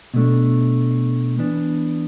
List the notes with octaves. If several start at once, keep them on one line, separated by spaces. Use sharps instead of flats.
B2 A3 D4
E3 B3 D4